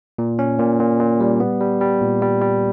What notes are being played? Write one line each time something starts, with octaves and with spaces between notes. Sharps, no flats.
A#2
C#4
A#2
A#2
A#2
G3
B3
G3
G3
A#2
G3
G3